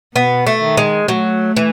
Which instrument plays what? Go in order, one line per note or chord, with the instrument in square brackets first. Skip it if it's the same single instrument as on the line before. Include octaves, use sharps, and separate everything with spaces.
[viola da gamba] B2 [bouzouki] B3
[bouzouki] A3
[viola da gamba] D#3
[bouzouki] G#3
[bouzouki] F#3 [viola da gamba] A3
[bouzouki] E3